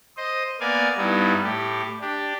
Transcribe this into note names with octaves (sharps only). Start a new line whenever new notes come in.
C5 D#5
A#3 B3 D5 F5 G#5
G2 G3 B3 D#4 E4
A2 G4
D4 G4